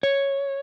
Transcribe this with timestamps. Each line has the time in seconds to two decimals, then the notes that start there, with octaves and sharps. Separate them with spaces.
0.03 C#5